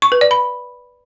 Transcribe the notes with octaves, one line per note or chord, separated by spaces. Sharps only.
C#6
B4
D5
B5